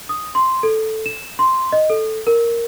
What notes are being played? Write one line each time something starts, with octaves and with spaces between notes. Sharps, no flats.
D#6
C6
A4
E7
C6
D#5
A4
A#4